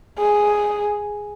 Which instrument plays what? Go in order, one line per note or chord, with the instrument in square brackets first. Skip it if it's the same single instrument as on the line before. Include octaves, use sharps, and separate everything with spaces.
[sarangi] G#4